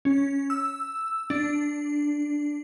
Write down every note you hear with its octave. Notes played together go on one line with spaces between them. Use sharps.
C#4
E6
D4